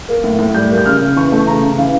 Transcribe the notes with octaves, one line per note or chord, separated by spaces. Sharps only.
A#3
A2
A2
G3 G6
A#3
G6
C#3 F6
C#3
E3 C#6
A3
C#3 A#5
C#3
E3 F5